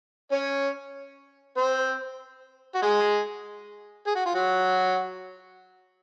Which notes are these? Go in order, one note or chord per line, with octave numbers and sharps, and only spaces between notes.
C#4 C#5
C4 C5
F#4
G#3 G#4
G#4
F#4
F4
F#3 F#4